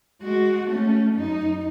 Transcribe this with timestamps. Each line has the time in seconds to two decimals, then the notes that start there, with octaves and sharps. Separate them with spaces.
0.22 G#3 F#4
0.67 A3 C#4
1.13 F#2 D#4